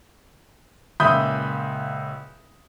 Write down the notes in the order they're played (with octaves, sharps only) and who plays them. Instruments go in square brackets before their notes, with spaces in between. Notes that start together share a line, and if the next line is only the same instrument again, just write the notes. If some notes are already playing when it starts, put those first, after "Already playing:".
[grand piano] C#2 A#2 E5 B5 D#6 G6